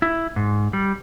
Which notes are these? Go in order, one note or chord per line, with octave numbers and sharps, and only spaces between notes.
E4
G#2
G3